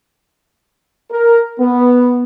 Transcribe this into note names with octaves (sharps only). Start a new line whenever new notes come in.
A#4
B3